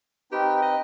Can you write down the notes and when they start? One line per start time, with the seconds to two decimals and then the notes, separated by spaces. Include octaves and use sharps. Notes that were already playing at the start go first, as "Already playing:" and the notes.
0.32 C4 D#4 G4 B4
0.62 D#5